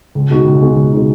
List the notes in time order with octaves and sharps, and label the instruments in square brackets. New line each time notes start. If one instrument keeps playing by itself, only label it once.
[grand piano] C#2
B2 G#3 D#4 F#4
C#2
B2 G#3 D#4 F#4
C#2
B2 G#3 D#4 F#4